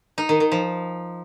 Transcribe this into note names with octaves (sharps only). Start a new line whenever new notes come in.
D#4
D#3
D#3
F3